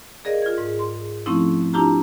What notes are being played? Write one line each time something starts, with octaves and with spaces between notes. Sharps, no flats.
G#4 A#4 D5 D#5 F5
F4 G#6
G#2
C6
F3 A3 C4 C#4 D#4 E4
D4 E4 F4 G4 A5 A#5